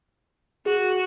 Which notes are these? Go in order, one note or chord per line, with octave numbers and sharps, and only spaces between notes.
F#4 G#4